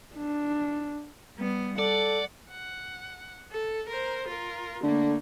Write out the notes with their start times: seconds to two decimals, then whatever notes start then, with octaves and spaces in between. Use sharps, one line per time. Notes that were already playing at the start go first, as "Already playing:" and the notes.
0.16 D4
1.37 G3 B3
1.78 A4 D5 F#5
2.50 F#5
3.52 A4
3.88 A#4 C5
4.27 F4 A#4
4.83 D3 A3 A#3